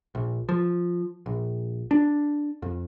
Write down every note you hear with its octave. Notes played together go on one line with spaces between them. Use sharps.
A#1
F3
A#1
D4
F2